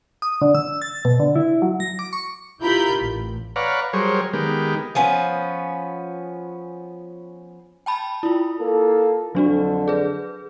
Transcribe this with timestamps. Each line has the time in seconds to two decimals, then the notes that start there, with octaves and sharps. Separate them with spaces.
0.22 D#6
0.42 D3
0.55 E6
0.82 A6
1.05 B2
1.20 D3
1.36 E4
1.62 F#3
1.80 A#6
1.99 D6
2.13 C#6
2.61 E4 F4 G4 A#4 B5 G6
2.98 A1
3.56 B4 C#5 D5 F5 F#5 A#5
3.93 F#3 G3 G#4 A#4 C5 C#5
4.33 D#3 G#3 B3 G4 A#4
4.95 F3 B3 C#4
7.86 G5 A5 B5
8.23 E4 F4
8.60 A#3 A4
9.35 F2 D3 F#3 D4 F#4
9.88 G#4 B4